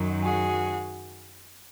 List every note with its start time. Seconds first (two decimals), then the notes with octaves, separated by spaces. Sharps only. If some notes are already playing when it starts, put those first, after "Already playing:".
Already playing: F#2 D#3 F#3
0.22 F#4 G#4